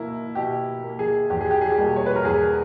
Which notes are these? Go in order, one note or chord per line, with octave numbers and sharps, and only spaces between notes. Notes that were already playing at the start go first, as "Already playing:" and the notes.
Already playing: B2 A#3 E4
B2 G4
A#3
G#4
E2 G4
G#4
G4
G#4
G4
B2 G3 A#3
C#5
B4
A#4
E2 G#4